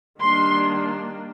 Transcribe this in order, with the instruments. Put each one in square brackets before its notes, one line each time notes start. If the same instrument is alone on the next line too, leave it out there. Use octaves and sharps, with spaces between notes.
[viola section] D#3 G3 A#3 D4 C6